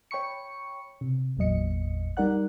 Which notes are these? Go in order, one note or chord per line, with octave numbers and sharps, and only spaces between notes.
C#5 G5 B5 C#6 C#7
C3
G#1 E2 A#2 F#3 D#5 C#7
G3 D#4 A#4 D5 F#5 F#6